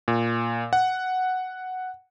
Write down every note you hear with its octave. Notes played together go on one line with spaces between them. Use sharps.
A#2
F#5